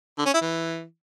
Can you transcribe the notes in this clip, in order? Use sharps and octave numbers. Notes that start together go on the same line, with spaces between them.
D3
C#4
E4
E3